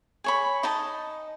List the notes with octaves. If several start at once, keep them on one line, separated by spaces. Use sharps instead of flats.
G#4 C#5 B5
D#4 D#5 A5